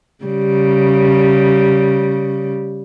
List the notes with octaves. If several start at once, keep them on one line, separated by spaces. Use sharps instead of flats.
C#3 G3